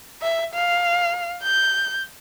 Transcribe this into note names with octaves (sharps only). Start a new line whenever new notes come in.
E5
F5
G6